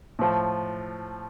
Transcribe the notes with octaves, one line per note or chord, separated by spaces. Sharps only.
A2 F3